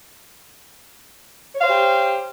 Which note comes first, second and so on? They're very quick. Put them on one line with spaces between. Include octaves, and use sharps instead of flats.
C#5 F5 C5 G4